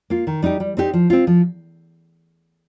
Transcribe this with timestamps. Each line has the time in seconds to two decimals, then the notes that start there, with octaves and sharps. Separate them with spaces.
0.10 A#3 F4
0.27 D#3
0.42 G3 D#4 G4
0.60 G3
0.77 C4 D#4 G4
0.94 F3
1.10 C4 F4
1.27 F3